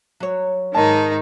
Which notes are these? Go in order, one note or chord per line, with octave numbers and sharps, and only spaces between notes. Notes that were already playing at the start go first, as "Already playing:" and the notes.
F#3 C#5
G#2 D#3 D#4 A5